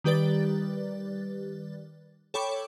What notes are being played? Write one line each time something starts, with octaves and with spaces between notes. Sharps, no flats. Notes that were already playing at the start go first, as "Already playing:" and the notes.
D#3 G3 G4 B4 D5 A6
A4 C#5 G5 B5 C#6 D6